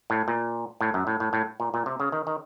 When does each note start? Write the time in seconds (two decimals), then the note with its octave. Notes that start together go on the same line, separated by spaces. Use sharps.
0.10 A2
0.28 A#2
0.81 A2
0.94 F#2
1.07 A2
1.20 A2
1.33 A2
1.60 A#2
1.74 A#2
1.86 C3
2.00 C#3
2.12 D#3
2.27 D#3